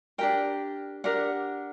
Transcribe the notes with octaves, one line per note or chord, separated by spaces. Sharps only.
D4 G4 A#4 G5
D4 G4 A#4 F#5